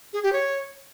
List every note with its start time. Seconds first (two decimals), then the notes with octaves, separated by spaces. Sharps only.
0.13 G#4
0.23 G4
0.33 C#5